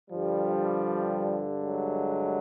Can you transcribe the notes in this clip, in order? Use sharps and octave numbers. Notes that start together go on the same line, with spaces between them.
G2 D3 F3 G3
F#3 G#3